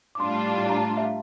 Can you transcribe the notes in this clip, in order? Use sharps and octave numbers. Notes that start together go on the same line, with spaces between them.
D6
A2 G3 D4 F4 C6
A#5
A5
E5
F5